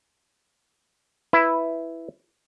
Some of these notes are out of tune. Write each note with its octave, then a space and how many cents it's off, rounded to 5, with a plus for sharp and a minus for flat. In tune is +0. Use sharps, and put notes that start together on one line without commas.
E4 +0 B4 +0